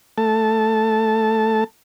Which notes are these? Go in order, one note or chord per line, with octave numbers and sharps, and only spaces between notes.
A3 A5